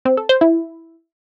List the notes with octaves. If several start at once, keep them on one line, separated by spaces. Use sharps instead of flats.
C4
A4
C5
E4